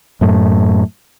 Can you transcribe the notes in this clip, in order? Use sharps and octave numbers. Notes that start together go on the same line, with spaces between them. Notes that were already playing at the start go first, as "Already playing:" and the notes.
F#2 A2